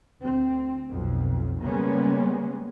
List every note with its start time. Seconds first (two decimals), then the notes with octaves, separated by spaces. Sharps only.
0.22 D2 C4
0.89 B1 F2 B2
1.61 C#3 G3 G#3 A#3 B3 C#4